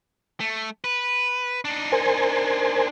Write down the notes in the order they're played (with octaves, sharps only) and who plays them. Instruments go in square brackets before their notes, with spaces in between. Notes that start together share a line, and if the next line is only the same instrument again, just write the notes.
[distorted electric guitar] A3
B4
D4 D#4
[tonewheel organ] A#4 C5 G#5